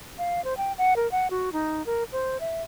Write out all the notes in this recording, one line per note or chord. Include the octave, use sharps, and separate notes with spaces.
F5
C5
G5
F#5
A#4
F#5
F#4
D#4
A#4
C5
E5